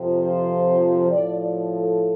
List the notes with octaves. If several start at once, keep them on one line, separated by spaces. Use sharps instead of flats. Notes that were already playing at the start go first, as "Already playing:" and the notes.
Already playing: F2 C3 F3
C5
A2 F3 D5
D5
A4